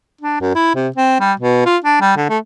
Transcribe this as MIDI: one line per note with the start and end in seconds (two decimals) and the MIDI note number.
0.21 0.38 62
0.41 0.54 42
0.55 0.74 64
0.75 0.88 48
0.96 1.18 60
1.20 1.32 55
1.40 1.64 47
1.65 1.77 65
1.85 1.99 62
2.01 2.15 55
2.16 2.26 50
2.29 2.38 57